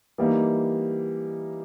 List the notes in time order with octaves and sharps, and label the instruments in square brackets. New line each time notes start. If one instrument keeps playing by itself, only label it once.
[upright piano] E3 G3 A#3 D#4